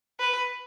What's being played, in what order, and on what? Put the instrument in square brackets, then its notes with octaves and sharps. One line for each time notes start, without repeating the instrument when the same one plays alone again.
[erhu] B4